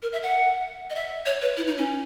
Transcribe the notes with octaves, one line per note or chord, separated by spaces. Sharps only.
A#4
E5
F#5
D#5
E5
C#5
B4
E4
D#4
C#4